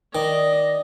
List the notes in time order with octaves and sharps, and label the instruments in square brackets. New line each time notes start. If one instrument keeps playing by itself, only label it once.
[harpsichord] D#3 [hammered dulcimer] D5 [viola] D#5